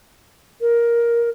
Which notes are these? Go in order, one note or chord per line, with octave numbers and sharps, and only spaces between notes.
A#4